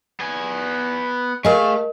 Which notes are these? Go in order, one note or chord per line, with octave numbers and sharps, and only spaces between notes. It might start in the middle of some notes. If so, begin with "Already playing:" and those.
B3 G#5
A3 G#4 A#4 D#5 F5